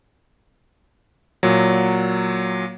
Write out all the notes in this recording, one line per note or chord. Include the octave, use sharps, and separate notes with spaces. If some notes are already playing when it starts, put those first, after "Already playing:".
A#2 F#3